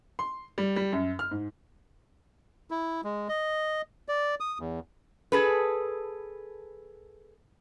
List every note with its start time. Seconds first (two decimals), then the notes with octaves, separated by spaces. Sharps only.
0.19 C6
0.58 G3
0.76 G3
0.93 F#2
1.19 F6
1.31 G#2
2.71 E4
3.04 G#3
3.29 D#5
4.08 D5
4.40 D#6
4.59 E2
5.32 G#4 A4 B4